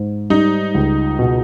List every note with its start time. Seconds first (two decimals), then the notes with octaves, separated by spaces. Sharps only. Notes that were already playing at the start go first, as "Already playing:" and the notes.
Already playing: G#2
0.30 G3 D#4
0.74 C#2
1.19 B2